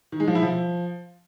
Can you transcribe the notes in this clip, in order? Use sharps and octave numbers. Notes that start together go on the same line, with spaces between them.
D#3
G#3
F3
E4
F3